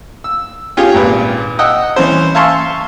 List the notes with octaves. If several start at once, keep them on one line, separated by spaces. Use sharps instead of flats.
E6
C#4 F4 G4 G#4
G#1 A#2 B4
D#5 F#5 G5 D#6 E6
E3 C#4 C5
E5 F5 G#5 A5 C6 C#6